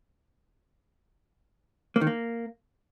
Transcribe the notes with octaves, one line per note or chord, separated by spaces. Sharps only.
A#3
D#3
A#3